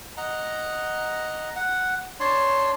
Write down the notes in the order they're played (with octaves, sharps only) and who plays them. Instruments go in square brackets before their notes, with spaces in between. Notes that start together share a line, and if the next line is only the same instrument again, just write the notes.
[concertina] D#5 F#5 A#5
[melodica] F#5
[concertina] D4 D5 A5 [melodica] C#5 C6